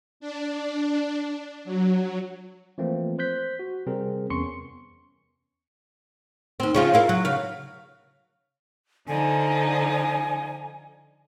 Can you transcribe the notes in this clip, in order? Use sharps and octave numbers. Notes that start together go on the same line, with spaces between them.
D4
F#3
E3 F3 A3 A#3 C4
C5 F#6 G6 B6
F#4
C3 G3 C4 G#4 A#4
E2 B3 C#4 C6 C#6 C#7
D#2 C4
C#3 F3 F4
E4 F4 A#4
F#3
C#3 F5
D3 F3 D#4 G#5